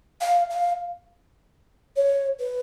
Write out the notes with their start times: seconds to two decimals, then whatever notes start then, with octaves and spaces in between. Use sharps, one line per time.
0.21 F5
0.50 F5
1.96 C#5
2.40 B4